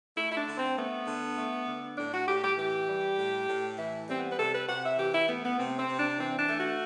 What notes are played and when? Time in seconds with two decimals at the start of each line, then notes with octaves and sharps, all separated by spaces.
0.17 A3 E4
0.31 E4
0.37 D4
0.47 D3
0.57 C4
0.77 A3 B3
1.07 D3
1.38 A3
1.68 D3
1.98 A2 D4
2.13 F#4
2.27 A2 G4
2.43 G4
2.57 E3 G4
2.89 G3
3.18 A2
3.48 A2
3.78 E3 E4
4.08 G3 C4
4.18 B3
4.31 B4
4.38 C3 A4
4.54 B4
4.68 C3 F#5
4.84 E5
4.98 E3 G4
5.14 E4
5.28 A3 B3
5.44 B3
5.58 C3 C4
5.78 C4
5.89 C3
5.99 D4
6.19 E3 C4
6.38 D4
6.49 A3
6.59 F#4